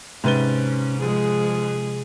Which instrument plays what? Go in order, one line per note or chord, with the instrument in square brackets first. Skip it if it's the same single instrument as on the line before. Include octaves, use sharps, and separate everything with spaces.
[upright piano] G#2 B4 G7 [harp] C3 A6 [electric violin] C#4
[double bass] F3 G#3 [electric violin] G#4